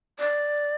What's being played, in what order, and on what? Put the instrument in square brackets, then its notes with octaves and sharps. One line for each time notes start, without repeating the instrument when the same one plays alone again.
[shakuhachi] D5